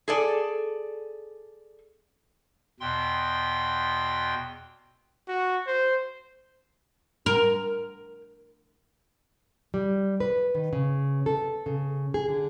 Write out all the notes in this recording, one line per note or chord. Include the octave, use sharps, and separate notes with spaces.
G#4 A4 D5
E2 B2 G5 C6
F#4
C5
A#4
G3
B4
D#3
C#3
A4
C#3
G#4
D3